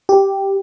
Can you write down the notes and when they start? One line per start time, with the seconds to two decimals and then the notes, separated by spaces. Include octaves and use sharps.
0.09 G4